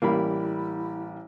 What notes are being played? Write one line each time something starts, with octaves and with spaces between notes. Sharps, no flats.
A1 G3 A#3 E4 B5